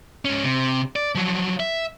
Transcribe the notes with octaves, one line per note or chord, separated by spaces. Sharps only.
G#2 C#4
C3
D5
F3 F#3
E5